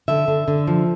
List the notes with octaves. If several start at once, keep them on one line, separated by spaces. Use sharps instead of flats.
D3 E5
D3
D3
F3